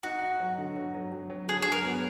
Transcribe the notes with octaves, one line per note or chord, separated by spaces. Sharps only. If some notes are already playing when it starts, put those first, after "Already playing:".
D#4 F#4
D#4
F#3
D3
F#3
F#3
F#3
F#3
D3 G#4
F#3 G#4
A#4
B3